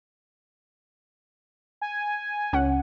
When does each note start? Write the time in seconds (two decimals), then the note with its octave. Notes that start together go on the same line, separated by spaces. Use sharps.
1.82 G#5
2.53 C#2 C#4 F#5